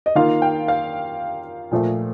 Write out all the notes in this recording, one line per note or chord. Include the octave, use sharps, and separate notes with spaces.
D#5
D#3 A#3 F4 F5
G5
F5
A#2 F3 A3